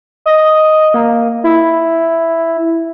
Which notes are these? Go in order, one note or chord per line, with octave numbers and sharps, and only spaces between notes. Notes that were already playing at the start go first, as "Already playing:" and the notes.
D#5
A#3
E4